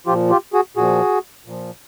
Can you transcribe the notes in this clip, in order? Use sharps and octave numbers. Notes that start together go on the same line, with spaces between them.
A#2 F3 F4 G4
F4 G4
F#4 G#4
A#2 F3 F#4 G#4
A#2 F3